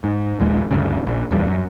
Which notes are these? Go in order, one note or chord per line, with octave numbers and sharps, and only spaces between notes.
G#2
A#1 D#2 G#3
D2 G2 C#3
A#1
D#1 E2 G3
F#2